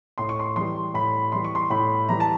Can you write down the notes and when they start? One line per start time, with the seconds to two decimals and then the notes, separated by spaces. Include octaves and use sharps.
0.18 A2 C6
0.29 C#6
0.39 C6
0.56 E3 G3 C6
0.94 A2 B5
1.32 E3 G3 C6
1.45 C#6
1.55 C6
1.70 A2 B5
2.09 E3 G3 A#5
2.20 A5